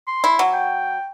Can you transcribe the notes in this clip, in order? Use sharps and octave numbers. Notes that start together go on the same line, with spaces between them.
C6
E4
F#3
G5